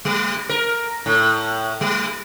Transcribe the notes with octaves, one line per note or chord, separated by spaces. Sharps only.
G3
A#4
A2
G3